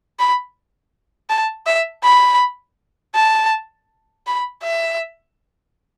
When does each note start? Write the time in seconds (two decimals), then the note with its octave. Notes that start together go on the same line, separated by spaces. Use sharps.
0.19 B5
1.30 A5
1.67 E5
2.04 B5
3.15 A5
4.27 B5
4.63 E5